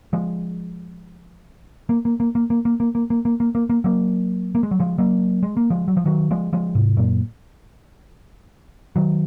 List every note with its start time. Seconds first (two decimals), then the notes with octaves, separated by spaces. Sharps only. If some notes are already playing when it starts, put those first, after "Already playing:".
0.13 F3 G#3
1.89 A#3
2.05 A#3
2.20 A#3
2.35 A#3
2.50 A#3
2.65 A#3
2.80 A#3
2.95 A#3
3.10 A#3
3.25 A#3
3.40 A#3
3.55 A#3
3.70 A#3
3.84 F#3 A#3
4.55 A#3
4.63 G#3
4.71 F#3
4.80 F3 G#3
4.98 F#3 A#3
5.43 G#3
5.57 A#3
5.70 F3 G#3
5.88 F#3
5.97 F3
6.06 D#3 F#3
6.31 F3 G#3
6.53 F3 G#3
6.75 G#2 C3
6.97 F#2 A#2
8.96 D#3 F#3